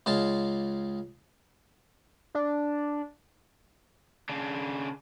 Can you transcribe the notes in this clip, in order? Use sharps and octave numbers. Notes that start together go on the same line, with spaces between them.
C#2 G#3 F5 A5
D4
C#3 D4